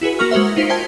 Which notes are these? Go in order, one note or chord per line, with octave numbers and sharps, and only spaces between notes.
E4 F#4 G#4 B4
A#3 F#4 A#4 C#6 F6
G#3 F#4 A#4 C5 E5
D#4 F4 C5 B6 C#7 D7
C5 G5 A5 G#6